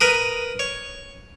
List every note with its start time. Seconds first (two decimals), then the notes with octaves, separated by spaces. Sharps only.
0.01 A#4 B4 D#6
0.59 C#5